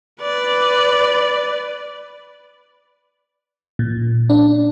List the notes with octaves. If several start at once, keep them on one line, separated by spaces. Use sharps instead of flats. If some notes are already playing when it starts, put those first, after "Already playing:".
B4 D5
A#2
D4